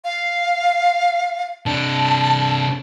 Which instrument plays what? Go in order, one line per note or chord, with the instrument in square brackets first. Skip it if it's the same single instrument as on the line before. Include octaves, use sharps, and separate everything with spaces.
[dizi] F5
[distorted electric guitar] C3 D4 [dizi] A5